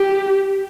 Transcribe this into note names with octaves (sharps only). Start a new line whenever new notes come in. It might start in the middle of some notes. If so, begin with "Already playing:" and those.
Already playing: G4